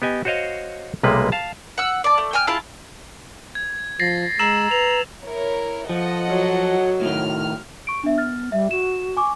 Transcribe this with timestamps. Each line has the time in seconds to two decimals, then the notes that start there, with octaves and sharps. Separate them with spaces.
0.02 B3 G4 D#5 G#5
0.25 F#4 C5 C#5 D#5 F5
1.03 B1 C3 G3 G#3 A#3 B4
1.32 F5 A5
1.78 F#5 E6
2.04 D5 A5
2.18 A3
2.33 G5 G#5 F6
2.47 E4 F4 G#4 A5
3.55 G#6
4.00 F3 A6 A#6 C7
4.39 G#3 A#5 E6 E7 F#7
4.71 B4 F7
5.23 E4 A#4 C#5
5.89 F3 A4 D#5 F#5
6.29 F#3
7.01 A2 D#3 F6
7.87 C#6 D7
8.04 B3 D4 E5
8.18 F6 A6
8.52 G3 E5
8.71 F#4 E7
9.17 G#5 C#6 D6